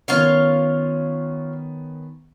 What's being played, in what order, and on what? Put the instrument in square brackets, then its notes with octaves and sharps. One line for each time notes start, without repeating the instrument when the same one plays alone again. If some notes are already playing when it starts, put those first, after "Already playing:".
[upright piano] D#3 B3 C#4 [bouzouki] F4 C#5 F5